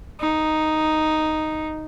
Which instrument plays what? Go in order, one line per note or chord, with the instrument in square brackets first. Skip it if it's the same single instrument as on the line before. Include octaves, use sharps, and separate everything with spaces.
[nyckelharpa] D#4